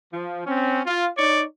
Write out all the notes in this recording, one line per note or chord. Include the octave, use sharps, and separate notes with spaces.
F3
C4 C#4
F4
D#4 C#5 D5